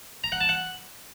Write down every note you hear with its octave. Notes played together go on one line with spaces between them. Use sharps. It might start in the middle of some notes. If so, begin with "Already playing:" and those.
A#5
F#5
A5
F#5